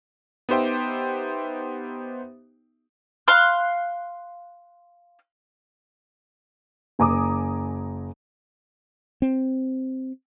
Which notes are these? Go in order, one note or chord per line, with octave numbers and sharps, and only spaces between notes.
B3 D#4 G4 C5 E5 G5
F5 C6 F6 F#6
F#1 G#5 A#5 D6 D#6
C4